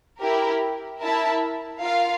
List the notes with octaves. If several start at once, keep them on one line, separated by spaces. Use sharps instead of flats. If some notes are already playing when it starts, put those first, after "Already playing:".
E4 G4 A#4
E4 A#4 E5 A5
F4 A#4 F5